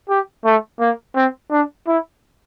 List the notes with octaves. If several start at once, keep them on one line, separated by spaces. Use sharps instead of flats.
G4
A3
A#3
C4
D4
E4